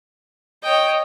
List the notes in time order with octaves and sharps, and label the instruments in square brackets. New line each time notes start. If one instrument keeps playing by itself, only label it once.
[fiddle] C#5 G5 [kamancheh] D#5